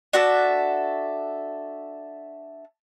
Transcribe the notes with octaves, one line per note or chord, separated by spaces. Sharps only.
D4 F#4 A4 E5